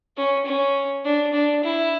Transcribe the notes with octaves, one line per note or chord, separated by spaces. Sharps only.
C#4
C#4
D4
D4
E4